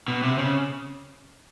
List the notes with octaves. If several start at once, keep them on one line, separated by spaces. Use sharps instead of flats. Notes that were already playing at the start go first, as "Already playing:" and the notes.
B2
C3
C#3